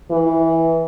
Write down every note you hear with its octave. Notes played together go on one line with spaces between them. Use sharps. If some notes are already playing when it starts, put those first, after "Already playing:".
E3